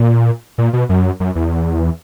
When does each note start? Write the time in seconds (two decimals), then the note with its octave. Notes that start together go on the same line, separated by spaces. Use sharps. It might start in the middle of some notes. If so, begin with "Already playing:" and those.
Already playing: A#2
0.58 A#2
0.73 B2
0.89 F#2
1.20 F#2
1.35 E2